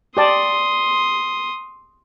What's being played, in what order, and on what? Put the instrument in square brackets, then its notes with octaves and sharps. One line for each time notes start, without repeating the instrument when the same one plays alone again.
[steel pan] G4 D5 A5 [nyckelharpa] C6 D#6